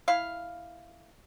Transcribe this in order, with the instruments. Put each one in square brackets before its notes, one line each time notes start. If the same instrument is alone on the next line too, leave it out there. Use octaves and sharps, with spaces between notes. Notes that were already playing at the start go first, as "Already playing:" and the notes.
[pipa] E4 F5